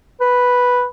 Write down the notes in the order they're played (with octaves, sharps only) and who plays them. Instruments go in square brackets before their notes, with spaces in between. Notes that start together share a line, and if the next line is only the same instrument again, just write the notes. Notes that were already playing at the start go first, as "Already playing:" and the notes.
[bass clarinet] B4